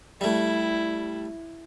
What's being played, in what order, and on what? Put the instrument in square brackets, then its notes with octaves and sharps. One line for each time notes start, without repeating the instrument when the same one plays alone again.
[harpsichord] G3 A3 [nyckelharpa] E4